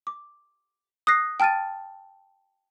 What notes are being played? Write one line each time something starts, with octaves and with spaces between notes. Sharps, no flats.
D6
D#6 F#6 A#6 C7
G5 A5 F6 A6 D#7